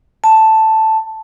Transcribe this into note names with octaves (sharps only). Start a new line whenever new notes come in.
A5